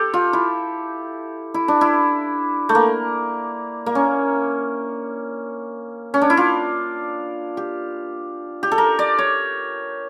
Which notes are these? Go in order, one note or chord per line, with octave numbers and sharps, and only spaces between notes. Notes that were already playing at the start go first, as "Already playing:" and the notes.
Already playing: G4 A4
F4
E4
E4
D4
E4
A3
A#3
A#3
C#4
C#4
D4
E4
F4
G4
G4
A4
A#4
D5
C#5